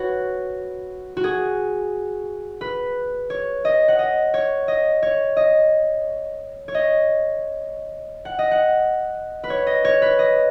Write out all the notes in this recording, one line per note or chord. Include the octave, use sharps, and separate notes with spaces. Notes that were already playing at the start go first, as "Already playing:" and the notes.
Already playing: F#4 B4 C#5
F#4
G#4
B4
C#5
D#5
F#5
D#5
C#5
D#5
C#5
D#5
C#5
D#5
F#5
D#5
F#5
B4
C#5
D#5
C#5
B4
D#5